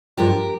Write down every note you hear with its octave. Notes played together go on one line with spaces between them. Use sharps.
G2 F3 G#3 D4 G4 A#4